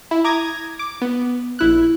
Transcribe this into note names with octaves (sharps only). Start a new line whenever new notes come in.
E4
A#5 D6 D#6 G#6 A#6
D6
B3
A#1 E4 F#6